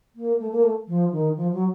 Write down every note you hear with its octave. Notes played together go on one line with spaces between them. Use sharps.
A#3
A3
A#3
A3
F3
D#3
F3
F#3